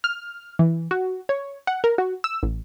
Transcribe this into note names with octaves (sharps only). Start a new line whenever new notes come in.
F6
E3
F#4
C#5
F#5
A#4
F#4
E6
A1